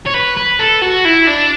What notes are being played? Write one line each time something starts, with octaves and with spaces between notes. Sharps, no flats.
C#5
B4
B4
A4
F#4
E4
D4